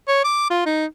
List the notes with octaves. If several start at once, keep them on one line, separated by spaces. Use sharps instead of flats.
C#5
D6
F4
D#4